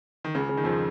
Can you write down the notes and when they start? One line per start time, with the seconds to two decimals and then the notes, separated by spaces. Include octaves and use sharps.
0.24 D#3
0.35 C#2 C#3
0.49 C#3
0.57 D#3
0.64 F2 F3